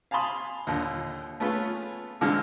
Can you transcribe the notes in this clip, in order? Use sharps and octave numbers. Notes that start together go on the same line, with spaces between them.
F5 G#5 A5 B5 C6 D#6
D#2 A#2 D3
A3 B3 C#4 F4 G#4
A#2 D3 E3 G#3 C4 F6